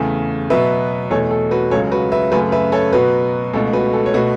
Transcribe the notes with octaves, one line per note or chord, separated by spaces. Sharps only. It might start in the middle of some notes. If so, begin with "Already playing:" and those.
Already playing: E2 C#3 A3
B2 F#3 B3 B4 E5
E2 B2 A3 A4 C#5
A4
F#4 B4
C#2 C#3 F#3 A4 C#5
F#4 B4
B4 E5
F#2 C#3 A3 F#4 B4
B4 E5
A4 C#5
B2 F#3 B3 F#4 B4
C#2 B2 A3 A4
F#4 B4
A4
C#5
B2 A3 F#4 B4